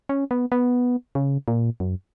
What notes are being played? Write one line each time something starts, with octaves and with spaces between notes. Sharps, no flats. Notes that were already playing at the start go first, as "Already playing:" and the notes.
C#4
B3
B3
C#3
A#2
F#2